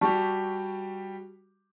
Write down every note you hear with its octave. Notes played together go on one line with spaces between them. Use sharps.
G3 F#4 G4 A5 C#6